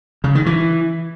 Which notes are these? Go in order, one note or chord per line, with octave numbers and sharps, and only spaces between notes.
C#3
D#3
E3